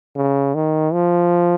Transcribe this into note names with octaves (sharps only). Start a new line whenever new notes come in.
C#3
D#3
F3